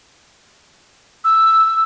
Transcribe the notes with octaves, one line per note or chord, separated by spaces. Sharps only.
E6